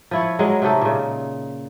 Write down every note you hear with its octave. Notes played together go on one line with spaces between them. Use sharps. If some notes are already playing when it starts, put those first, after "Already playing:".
F3 E4 C#5
F#3 G#3 A#4 D#5
C3 A3 D#4 A4
A#2 C#3